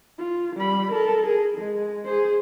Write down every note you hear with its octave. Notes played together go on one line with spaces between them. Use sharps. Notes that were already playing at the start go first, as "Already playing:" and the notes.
F4
G3 B5
A4 A#4
G#4
G#3
G#4 C5